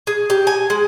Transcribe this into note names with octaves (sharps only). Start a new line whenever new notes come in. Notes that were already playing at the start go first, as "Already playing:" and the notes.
G#4
G4
G#5
G#3